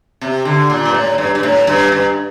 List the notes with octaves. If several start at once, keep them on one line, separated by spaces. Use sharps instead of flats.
C3
D3
A#2
G2
A2
G2
G2
A2
G2
G2